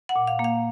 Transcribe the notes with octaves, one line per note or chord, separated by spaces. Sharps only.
F#5
A#2
F5
A#3
F5